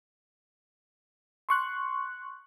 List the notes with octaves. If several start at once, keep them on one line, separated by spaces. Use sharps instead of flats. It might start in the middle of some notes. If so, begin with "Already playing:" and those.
C6 C#6 F#6